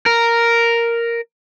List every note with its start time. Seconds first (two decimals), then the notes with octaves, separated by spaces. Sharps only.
0.06 A#4